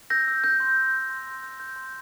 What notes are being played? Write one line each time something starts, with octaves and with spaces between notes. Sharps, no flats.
E6 G6 A#6
E6
G6
C6
E6
G6
C6
C6
G6
G6
C6